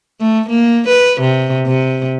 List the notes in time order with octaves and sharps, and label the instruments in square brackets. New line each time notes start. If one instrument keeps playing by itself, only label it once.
[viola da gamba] A3
A#3
B4
C3
C3